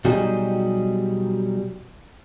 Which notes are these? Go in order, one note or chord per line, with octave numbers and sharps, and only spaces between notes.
B2 F#3 G3 D#4 G4 G#4